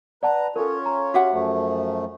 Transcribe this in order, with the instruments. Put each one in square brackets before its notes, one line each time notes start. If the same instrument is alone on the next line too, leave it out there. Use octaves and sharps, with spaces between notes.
[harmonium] B4 A#5 [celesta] D5 F#5 A5
[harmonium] C#4 F4 C#5 [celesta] A4 A#4
[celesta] A#5
[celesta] F#4 [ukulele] G4 E5 F#5
[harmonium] F#2 F3 A3